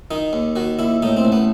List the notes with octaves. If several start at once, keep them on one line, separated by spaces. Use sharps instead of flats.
D#3 D#4
D#2
D#3 F#4
D#2 E4
A2 D#4
C4
A1
B3